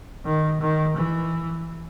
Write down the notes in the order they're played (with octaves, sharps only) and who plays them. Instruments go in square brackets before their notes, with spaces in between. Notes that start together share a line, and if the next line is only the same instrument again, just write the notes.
[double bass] D#3
D#3
E3